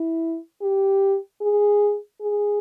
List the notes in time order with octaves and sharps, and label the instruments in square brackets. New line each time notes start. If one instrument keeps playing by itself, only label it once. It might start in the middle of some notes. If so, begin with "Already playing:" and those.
Already playing: [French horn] E4
G4
G#4
G#4